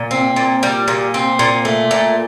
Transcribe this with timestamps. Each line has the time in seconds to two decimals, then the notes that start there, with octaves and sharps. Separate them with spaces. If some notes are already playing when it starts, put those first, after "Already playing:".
Already playing: A#2
0.11 C4
0.36 A#2
0.63 G3
0.88 A#2
1.14 C4
1.39 A#2
1.65 A3
1.91 A#2